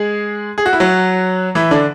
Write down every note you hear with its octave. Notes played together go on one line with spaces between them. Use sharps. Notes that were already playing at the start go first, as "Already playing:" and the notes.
Already playing: G#3 G#4
G#4
F#4
E4
F#3 F#4
E3 E4
D3 D4